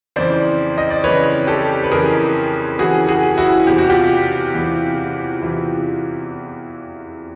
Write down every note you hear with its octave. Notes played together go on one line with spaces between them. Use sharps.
F2 C#3 E3 C5 D5
D#5
D5
F2 C#3 E3 B4 C#5
G4 A4
B4
F2 C#3 E3 G#4 A#4
F2 C#3 E3 F#4 G#4
F#4 G#4
E4 F#4
E2 C3 E3 G4
F#4
F4 G4
E2 C3 E3
E2 C3 E3